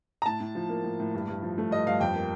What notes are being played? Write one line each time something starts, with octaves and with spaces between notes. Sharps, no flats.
A#5
A2 A5
A2
F3
A#3
A2
A2
G2
G2
F3
A3
G2 D#5
G2 F5
F2 G5
A#3